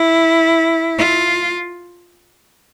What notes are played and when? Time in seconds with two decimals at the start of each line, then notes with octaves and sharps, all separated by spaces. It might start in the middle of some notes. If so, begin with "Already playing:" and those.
Already playing: E4
0.98 F4